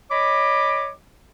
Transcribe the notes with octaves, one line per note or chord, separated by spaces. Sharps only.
C#5 D#5 B5 D6